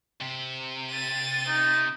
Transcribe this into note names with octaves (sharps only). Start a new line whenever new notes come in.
C3
A6 D#7
D#4